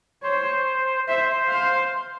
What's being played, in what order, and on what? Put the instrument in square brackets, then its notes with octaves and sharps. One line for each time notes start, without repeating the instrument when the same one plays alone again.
[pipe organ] C5 [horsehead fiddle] C#5
[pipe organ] C5 [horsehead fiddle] E5
[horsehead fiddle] F5